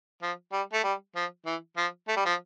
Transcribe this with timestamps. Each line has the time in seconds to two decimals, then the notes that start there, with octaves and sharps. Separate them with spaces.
0.22 F3
0.52 G3
0.73 A3
0.83 G3
1.15 F3
1.46 E3
1.77 F3
2.08 A3
2.16 G3
2.25 F3